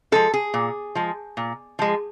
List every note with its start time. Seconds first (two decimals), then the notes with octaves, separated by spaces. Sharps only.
0.12 F3 G#3 A4
0.34 G#4
0.54 A#2
0.95 F3 G#3
1.37 A#2
1.79 F3 G#3